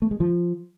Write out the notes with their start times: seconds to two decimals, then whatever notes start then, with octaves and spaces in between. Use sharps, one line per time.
0.02 A3
0.11 G#3
0.20 F3